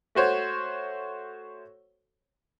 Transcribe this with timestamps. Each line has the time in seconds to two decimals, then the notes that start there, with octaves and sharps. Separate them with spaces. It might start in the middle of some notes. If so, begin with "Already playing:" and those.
0.15 A3 F#4 C5 C#5